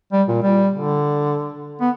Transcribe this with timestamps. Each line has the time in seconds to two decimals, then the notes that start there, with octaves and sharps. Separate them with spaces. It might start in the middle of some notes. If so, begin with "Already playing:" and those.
0.12 G3
0.28 A#2
0.42 G3
0.74 D3
1.80 B3